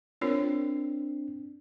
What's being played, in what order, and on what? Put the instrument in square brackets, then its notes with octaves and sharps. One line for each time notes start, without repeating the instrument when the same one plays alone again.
[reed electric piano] C4 D4 [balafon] F4 A#4 C#5